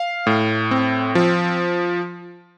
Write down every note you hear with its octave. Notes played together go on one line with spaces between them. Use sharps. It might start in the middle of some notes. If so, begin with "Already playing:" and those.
Already playing: F5
A2
C4
F3